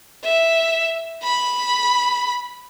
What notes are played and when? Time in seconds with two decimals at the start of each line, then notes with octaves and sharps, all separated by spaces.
0.24 E5
1.23 B5